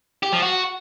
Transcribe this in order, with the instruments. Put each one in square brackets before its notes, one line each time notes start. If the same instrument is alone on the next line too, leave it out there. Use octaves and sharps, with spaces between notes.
[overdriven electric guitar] G4
F3
F#4